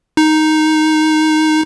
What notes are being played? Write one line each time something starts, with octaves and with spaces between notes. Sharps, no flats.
D#4